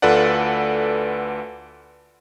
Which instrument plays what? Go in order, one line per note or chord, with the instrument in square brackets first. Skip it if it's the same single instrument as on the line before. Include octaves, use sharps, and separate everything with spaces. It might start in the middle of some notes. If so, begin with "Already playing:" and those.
[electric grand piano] D2 F4 A4 B4 D5 F#5